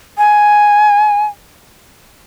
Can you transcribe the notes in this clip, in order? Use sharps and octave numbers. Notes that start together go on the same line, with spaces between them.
G#5